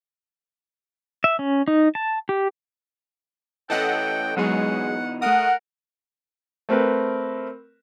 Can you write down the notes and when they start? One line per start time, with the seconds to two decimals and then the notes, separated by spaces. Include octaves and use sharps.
1.24 E5
1.39 C#4
1.68 D#4
1.95 A5
2.29 G4
3.70 E3 A3 C#4 A4 D#5 F#5 G5
4.37 B2 E3 F#3 G#3 D#4 G#4 F#5
5.22 A3 A#4 F#5 D#6
6.69 A3 C4 A#4 B4